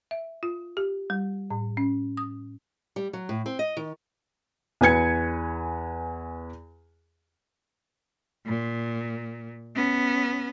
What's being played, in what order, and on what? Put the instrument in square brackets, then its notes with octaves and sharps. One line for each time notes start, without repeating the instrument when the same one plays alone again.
[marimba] E5
F4
G4
G3
A2
C#4
D#6
[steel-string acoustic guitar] G3
F#3
A2
C4
D#5
D#3
[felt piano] E2 B4 G#5 G#6 C#7
[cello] A#2
B3 C#4